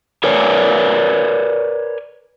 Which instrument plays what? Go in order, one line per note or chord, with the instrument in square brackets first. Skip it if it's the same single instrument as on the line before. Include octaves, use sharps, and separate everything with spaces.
[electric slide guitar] A#4 B4 C#5 D5 G#5